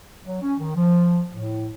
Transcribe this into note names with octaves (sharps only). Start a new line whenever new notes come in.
F#3
C#4
D#3
F3
A2